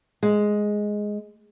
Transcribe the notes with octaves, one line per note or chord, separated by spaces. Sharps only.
G#3